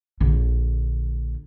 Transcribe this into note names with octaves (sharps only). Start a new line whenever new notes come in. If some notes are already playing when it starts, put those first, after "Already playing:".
A#1 D3